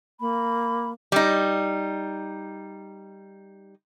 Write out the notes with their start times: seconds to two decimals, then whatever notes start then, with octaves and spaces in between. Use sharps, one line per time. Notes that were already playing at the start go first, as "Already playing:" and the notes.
0.20 A#3 B5
1.12 G3 D#4